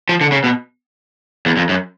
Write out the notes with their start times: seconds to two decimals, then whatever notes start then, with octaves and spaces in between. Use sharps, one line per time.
0.09 F3
0.21 D3
0.32 C#3
0.44 B2
1.46 E2
1.57 F2
1.69 F#2